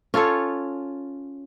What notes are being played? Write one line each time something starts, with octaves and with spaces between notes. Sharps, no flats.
C#4 F4 A4 C#5